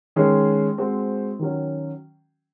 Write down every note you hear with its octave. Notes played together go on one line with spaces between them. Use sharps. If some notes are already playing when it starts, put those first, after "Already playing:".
D#3 G#3 C#4 G#4
G#3 C4 F#4 C5
D#3 F#3 C#4